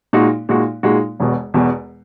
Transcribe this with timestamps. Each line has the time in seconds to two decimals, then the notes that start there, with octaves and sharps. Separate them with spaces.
0.13 A#2 G#3 D#4 F#4
0.49 A#2 G#3 D#4 F#4
0.83 A#2 G#3 D#4 F#4
1.20 E1 E2 B2
1.54 E1 E2 B2